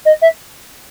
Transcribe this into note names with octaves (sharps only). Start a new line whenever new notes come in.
D#5
E5